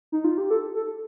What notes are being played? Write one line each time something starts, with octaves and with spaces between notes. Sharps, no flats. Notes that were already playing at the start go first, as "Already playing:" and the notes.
D#4
F4
G4
A4
A4